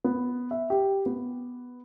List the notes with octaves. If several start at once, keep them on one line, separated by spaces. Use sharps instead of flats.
B3
E5
G4
B3